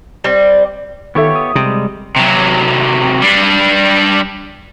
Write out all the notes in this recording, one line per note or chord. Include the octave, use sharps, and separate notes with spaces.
G3 C4
D#3 B3 F4 G4 A4 C#5 E5 C#6
D#6
C3 G3 G#3
C3 F#3
G3 D4